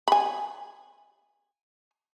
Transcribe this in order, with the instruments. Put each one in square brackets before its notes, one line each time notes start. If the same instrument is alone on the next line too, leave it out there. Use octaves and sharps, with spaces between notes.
[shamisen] G#5 B5